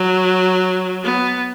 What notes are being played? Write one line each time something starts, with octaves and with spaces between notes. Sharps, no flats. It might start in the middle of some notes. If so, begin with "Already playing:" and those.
Already playing: F#3
B3